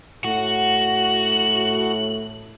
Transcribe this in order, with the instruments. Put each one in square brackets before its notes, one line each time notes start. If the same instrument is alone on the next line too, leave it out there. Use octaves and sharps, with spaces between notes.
[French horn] A2 [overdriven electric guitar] F#4 [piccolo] F#7